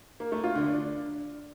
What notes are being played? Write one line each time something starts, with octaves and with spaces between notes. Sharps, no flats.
A#3
A3
F4
D3
D4